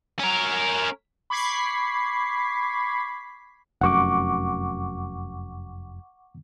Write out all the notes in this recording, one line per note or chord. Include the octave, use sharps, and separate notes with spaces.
C#4 A#4
B5 C#6 D6 G#6 B6 C7
F1 F#2 F#5 C#6 D6